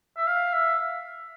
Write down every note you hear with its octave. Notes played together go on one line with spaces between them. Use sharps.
E5
F5
E5